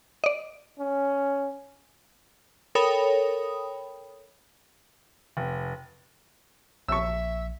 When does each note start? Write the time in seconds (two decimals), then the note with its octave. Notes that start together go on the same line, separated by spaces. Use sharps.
0.24 D5 D#5
0.79 C#4
2.75 A4 A#4 C#5 G5 B5 D#6
5.37 F1
6.88 A#1 E5 C#6 E6